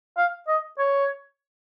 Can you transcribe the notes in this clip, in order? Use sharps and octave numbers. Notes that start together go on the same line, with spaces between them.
F5
D#5
C#5